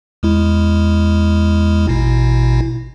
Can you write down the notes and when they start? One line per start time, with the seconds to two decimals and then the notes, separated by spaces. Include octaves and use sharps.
0.23 E2 G#3 E4
1.88 A1 B2 E4